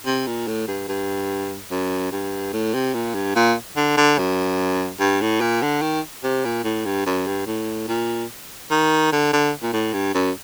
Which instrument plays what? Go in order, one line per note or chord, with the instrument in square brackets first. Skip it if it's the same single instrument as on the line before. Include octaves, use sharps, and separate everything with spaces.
[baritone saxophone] C3
A#2
A2
G2
G2
F#2
G2
A2
C3
A#2
G2
A#2
D3
D3
F#2
G2
A2
A#2
D3
D#3
C3
A#2
A2
G2
F#2
G2
A2
A#2
D#3
D3
D3
A#2
A2
G2
F#2